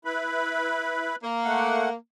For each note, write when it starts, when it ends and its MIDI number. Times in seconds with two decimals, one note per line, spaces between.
0.05 1.16 64
0.05 1.16 71
0.05 1.16 83
1.23 1.93 58
1.45 1.89 57
1.45 1.89 78